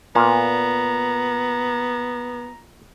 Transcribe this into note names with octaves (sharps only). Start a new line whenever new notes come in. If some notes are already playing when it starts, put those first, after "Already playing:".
A#2 B3 A#5